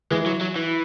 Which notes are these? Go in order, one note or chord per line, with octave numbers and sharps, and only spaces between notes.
E3 G#3
F#3
F#3
E3